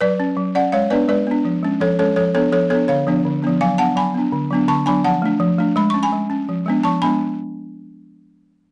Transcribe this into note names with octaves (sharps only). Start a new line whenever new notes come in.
F#3 B4 D5
C#4
F#3
C#4 D5 F#5
G#3 C#5 F5
B3 D4 B4 D5
G#3 B4 D5
B3 D4
F3
G#3 C#4
F3 A4 C#5
G#3 C#4 A4 C#5
F3 A4 C#5
B3 D4 A4 C#5
F3 A4 C#5
B3 D4 A4 C#5
D3 C#5 F5
F3 B3 D4
D3
F3 B3 D4
F#3 F5 G#5
B3 D4 F#5 A5
F#3 G#5 B5
B3 D4
D3
F#3 B3 D4
D3 A5 C#6
F#3 B3 D4 G#5 B5
F3 F#5 A5
A3 D4
F3
A3 D4
G#3 B5
C#4 C#6
G#5 B5
G#3
C#4
F3
G#3 B3 D4
F3 A5 C#6
G#3 B3 D4 G#5 B5